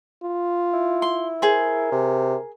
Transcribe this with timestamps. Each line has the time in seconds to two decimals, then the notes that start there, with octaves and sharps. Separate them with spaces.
0.24 F4
0.74 E4
1.02 C6
1.42 G#4 A#4 C5
1.92 C3